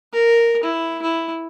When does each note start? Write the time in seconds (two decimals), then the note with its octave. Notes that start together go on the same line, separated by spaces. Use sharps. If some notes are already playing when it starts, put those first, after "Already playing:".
0.13 A#4
0.64 E4
1.02 E4